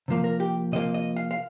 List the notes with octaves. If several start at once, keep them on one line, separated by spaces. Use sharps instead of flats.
C3 F3 A#3
A#4
G4
C3 F3 A#3 D#5
D#5
F5
F5